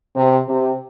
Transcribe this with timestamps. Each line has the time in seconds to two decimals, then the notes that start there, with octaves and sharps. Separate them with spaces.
0.16 C3
0.49 C3